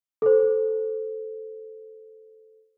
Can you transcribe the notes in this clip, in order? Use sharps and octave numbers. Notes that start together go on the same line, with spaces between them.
A4 C5